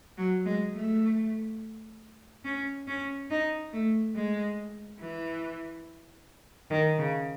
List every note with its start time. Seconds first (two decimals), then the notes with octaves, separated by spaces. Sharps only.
0.18 F#3
0.46 G#3
0.74 A3
2.45 C#4
2.88 C#4
3.30 D#4
3.73 A3
4.15 G#3
5.01 E3
6.70 D#3
6.98 C#3